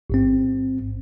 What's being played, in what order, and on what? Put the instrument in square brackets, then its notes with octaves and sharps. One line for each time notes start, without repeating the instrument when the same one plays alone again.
[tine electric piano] A1 G#2 C4